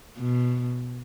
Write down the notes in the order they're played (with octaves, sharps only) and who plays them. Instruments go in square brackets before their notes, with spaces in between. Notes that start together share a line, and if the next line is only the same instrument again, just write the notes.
[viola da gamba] B2